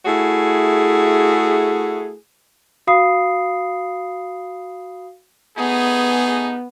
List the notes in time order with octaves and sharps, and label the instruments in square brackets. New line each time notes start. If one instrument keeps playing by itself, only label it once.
[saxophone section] A3 E4 F#4 G#4
[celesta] F#4 F5 B5 D#6 C7
[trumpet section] A3 D#4 G#4 [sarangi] B3